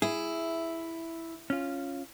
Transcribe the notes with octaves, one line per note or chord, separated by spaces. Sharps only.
E4 G#4
C#4 F4